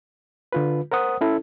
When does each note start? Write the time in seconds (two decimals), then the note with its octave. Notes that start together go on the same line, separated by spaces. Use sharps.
0.52 D3 F4 B4
0.91 A#4 C5 F#5 D#6
1.21 C#4 E4 A4